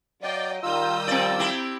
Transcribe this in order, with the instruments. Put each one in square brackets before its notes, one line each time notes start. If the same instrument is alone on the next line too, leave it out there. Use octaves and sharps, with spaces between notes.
[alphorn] F#3 [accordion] D5 [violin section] D#5 F5 G5
[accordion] D#3 G3 E6 [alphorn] F4 [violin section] A#5 D#6 G6
[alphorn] F3 [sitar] C4 D5
[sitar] C4 E4 G4